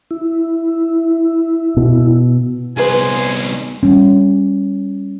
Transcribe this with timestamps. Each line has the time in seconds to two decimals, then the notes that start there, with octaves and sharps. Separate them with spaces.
0.11 E4
1.77 B2
2.77 C2 B3 G#4 B4 C5 G#5
3.83 G3 C#4